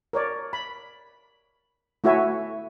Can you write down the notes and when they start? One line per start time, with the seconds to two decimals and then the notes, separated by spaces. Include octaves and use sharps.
0.13 A#4 C#5 D5
0.53 B5
2.04 A3 E4 F#4 C#5 E5 G#5